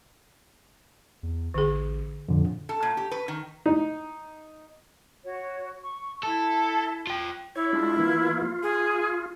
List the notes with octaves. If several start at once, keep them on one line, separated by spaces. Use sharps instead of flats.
E2
A1 D3 G#4
F2 A#2 D3
A4
A#2
G4
B4
D#3
D#4
F#4 C#5
C#6
E4 A4 E5 A5
F4 G5
E4 C#5
G#3 D4 F4
E3 A#3 F4
F4
G#4